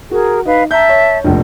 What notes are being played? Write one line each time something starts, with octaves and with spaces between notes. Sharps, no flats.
F#4 G#4 A#4
D#4 B4 F5
E5 A5 A#5 G6
C#5
F1 A#1